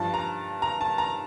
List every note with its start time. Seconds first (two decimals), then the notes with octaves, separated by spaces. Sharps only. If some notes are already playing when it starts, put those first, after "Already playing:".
Already playing: G2 F3 A5
0.14 A#5
0.62 A#5
0.81 A5
0.98 A#5